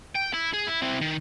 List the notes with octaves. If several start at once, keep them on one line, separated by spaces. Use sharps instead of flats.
G5
E4
G#4
E4
C4 E4
D#3